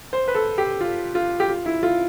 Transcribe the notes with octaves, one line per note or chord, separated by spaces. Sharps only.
C5
B4
A4
G4
F4
F4
G4
F4
E4
F4